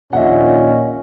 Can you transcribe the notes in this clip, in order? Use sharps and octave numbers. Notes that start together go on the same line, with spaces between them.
A#1 D#2 A#2 C#4 D#5 E5 F#5